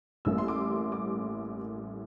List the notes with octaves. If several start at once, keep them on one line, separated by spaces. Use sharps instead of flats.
A1 A2 G3 A#3 E6
C6
D6
D6